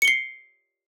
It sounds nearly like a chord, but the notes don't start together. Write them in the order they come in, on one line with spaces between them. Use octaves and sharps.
C#7 G7 C7